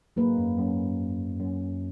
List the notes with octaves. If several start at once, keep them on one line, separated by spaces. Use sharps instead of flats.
G#2 F#3 A#3 D#4 G#4 B4
F#2
F#2
F#2